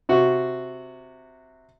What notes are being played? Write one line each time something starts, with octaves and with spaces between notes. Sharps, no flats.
C3 F#4